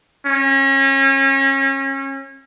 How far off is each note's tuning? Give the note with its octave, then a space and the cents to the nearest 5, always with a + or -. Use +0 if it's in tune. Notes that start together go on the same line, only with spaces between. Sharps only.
C#4 -30